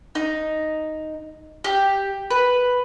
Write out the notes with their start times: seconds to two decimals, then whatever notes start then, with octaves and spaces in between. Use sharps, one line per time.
0.15 D#4
1.64 G4
2.30 B4